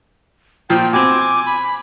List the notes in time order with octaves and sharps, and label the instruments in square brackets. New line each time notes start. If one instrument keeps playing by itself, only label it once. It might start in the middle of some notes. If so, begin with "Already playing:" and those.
[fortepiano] A#2 F3 [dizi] G5
[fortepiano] B2 C4 [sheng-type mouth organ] G#5 [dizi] D6
[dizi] B5